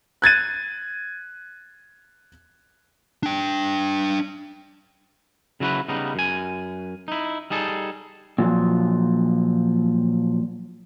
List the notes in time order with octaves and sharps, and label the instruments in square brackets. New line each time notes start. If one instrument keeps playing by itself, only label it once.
[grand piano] F#6 G#6 A6 D#7
[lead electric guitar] D4 G5
[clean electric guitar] C#3 F#3 E4 F#4 B4
C#3 G3 B3 D#4
F#2 G#5
D#4 E4
G3 D#4 G#4 A4
[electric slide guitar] A#2 F3 F#3